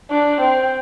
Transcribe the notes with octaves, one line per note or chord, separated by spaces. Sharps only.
D4
C4